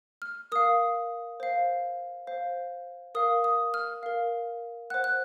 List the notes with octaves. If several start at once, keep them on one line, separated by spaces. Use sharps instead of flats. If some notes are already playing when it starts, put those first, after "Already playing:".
F6
A#4 F5 D#6
C5 F5
C5 F5
A#4 F5 D#6
D#6
F6
A#4 F5
C5 F#5 F#6
F#6